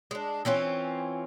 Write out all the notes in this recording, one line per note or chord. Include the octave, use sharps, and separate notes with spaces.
G#3 D4
E3 C4 C#4 F4